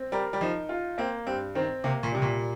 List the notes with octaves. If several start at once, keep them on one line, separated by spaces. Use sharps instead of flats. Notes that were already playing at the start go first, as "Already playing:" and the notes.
Already playing: C4
G3 A#4
G3
F3 D#4
F4
A#3 C4
G2 C4
D#3 C4
C3 A#3
A#2
C3 G3
A#2